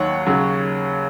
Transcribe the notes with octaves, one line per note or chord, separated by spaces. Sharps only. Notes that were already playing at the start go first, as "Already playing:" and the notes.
Already playing: D#2 D#3 F#3 C#5 F#5
D#2 C#3 F#3